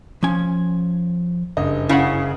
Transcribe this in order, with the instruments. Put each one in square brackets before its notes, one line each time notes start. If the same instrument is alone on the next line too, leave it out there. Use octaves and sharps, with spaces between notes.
[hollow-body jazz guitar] F3 C#4 G#5
[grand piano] F#1 G2 D#5
[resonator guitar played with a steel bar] C#3 [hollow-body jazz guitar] E4 C#5 F#5